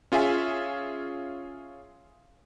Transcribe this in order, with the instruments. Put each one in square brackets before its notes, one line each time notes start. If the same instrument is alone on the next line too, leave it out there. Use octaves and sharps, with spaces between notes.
[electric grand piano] C#4 F4 G#4 E5 G#5